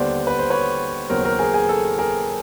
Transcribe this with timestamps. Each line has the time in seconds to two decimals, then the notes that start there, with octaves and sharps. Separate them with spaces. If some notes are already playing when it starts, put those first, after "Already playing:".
Already playing: D#2 D3 G3 B3 C5 D5
0.27 B4
0.39 C5
0.50 B4 C#5
1.10 D#2 C#3 F#3 B3 A#4 C5
1.24 A#4 C5
1.39 G#4 A#4
1.54 G#4
1.69 A4
1.98 G#4 A#4